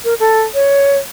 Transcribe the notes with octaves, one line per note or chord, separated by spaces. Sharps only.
A#4
A4
C#5